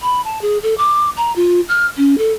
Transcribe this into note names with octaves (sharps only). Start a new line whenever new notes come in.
B5
A5
G#4
A4
D6
A#5
F4
F6
C#4
A4